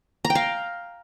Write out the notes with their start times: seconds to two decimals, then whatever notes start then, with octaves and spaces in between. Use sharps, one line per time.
0.25 A#5
0.30 G5
0.35 F5